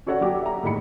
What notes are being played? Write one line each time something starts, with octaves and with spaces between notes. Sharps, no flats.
C#4 F#4 A4 C#5 D5 F#5
F#3 F#4 G4 D6
E5 A#5
A2 D#3 G#3 B5 C#7